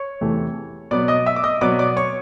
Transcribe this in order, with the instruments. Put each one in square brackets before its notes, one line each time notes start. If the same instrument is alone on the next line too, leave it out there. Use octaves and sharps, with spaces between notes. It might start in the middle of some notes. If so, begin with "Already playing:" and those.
Already playing: [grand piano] C#5 C#6
E2 C3 E3 A3
B2 F#3 B3 D5 D6
D#5 D#6
E5 E6
D6
D#5 D#6
B2 F#3 B3 D5 D6
D5 D6
C#5 C#6